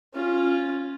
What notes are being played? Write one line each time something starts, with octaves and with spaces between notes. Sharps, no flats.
C#4 F4